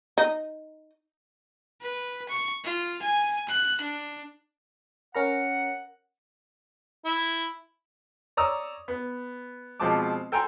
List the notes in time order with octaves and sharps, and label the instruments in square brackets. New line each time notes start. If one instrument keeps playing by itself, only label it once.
[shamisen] D#4
[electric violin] B4
C#6
F4
G#5
F#6
D4
[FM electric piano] C#4 A#4 A#5 [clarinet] F#5
[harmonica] E4
[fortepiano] C#5 D5 A#5 D#6 E6
B3
B2 F3 G#3 C4 A5 D6
A4 G5 G#5 A#5 C6